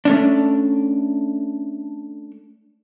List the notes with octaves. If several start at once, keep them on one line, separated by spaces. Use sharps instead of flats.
A3 C#4 D4